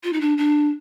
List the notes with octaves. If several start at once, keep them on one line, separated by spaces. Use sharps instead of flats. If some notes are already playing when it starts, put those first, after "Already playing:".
F4
D#4
D4
D4